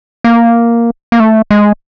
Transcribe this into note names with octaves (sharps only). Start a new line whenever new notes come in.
A#3
A#3
A3
G#3